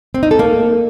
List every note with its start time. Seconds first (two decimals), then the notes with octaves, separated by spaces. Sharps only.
0.14 C4
0.23 D#4
0.31 A4
0.39 A#3